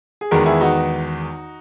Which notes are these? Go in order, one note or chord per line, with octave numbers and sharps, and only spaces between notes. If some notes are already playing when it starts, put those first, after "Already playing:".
G#4
E2 D#3 G#3 B3 F#4 A#4
E4 G#4
D#4 F#4